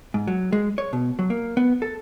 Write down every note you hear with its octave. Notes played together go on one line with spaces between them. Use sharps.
G#2
F#3
G#3
C#5
B2
F#3
A#3
B3
A4